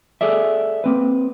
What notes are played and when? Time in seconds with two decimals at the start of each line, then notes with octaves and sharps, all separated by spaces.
0.21 G#4 A4 D5 E5
0.84 A#3 C4 B4